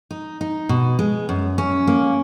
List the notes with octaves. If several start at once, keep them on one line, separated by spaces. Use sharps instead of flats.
D#4
D#4
B2
G#3
F#2
C#4
A#3